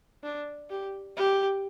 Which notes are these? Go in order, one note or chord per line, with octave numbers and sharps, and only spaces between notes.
D4
G4
G4